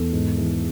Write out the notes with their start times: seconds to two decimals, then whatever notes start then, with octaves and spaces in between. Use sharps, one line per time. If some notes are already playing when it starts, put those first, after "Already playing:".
Already playing: E2 A4
0.13 G#2
0.38 E3